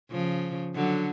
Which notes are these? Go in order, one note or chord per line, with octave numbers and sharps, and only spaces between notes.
C#3 F3
D3 F#3